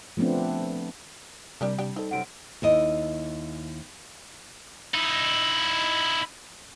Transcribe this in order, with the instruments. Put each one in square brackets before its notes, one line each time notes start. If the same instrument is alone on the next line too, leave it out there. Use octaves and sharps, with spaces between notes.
[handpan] F3 A3 B3 C4 D4
[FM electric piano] C3 [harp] G3 [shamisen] D4 G4 A#4
[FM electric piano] C3 [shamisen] D4 G4 G5
[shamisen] C4 [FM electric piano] D#4 A4
[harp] F#2 C3 [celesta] F#5 D7
[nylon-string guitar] D#2 E4 D#5
[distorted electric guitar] D#4 E4